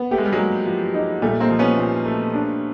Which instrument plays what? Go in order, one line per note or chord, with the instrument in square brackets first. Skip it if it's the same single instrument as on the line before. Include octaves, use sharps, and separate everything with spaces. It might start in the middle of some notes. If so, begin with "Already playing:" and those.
Already playing: [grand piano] B3
[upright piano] A3 [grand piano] G4
[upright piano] G#3
G3
F#3 G#3
[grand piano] A#3
F3
D#4
[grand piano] A#2 [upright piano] G3 A3
[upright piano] A#3 C4
[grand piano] F3
[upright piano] B3 C#4
[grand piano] A#2
A3
D4